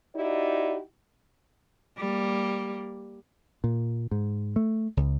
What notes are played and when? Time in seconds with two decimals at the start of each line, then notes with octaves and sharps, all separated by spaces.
0.15 D#4 E4 F#4 G4 D5
1.97 G3 A#3
3.64 A#2
4.11 G#2
4.56 A3
4.97 C#2